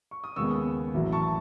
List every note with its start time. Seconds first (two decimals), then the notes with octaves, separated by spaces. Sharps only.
0.11 C#6
0.24 D#6
0.36 D#2 C#3 G#3 B3 C#6 E6
0.94 A1 A2 F#3
1.12 A5 C#6